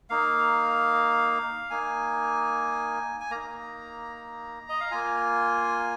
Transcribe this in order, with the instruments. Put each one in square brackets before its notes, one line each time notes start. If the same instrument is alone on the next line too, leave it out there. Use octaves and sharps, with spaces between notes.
[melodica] A#3 D#4 F5
A#3 D#4 G#5
G#5
A#3 D#4 A#5
D#5
F5
A#3 F4 G#5